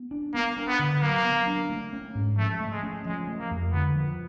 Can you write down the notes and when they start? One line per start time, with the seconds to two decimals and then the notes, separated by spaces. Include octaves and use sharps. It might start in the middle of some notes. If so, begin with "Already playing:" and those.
Already playing: B3
0.11 D4
0.34 A#3 B3
0.57 D4
0.68 B3
0.79 D3
1.02 F#3 A#3
1.24 B3
1.47 D4
1.70 A3
1.93 C#4
2.15 G#2
2.37 F3 A3
2.60 A3
2.72 G#3
2.83 C#4
3.05 F3 G#3
3.27 A3
3.40 A#3
3.51 F2
3.73 D3 B3
3.96 F3